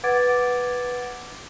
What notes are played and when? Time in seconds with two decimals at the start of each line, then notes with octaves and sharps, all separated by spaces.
0.04 B4 F#5 D6 G#6 A6 D7